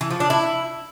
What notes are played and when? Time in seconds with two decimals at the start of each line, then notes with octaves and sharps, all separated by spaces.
0.01 E3
0.11 F3
0.20 D4
0.30 E4